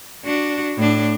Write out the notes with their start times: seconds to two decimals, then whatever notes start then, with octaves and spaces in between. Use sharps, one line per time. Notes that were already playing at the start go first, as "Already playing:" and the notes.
0.25 D4 F#4
0.77 A2 D4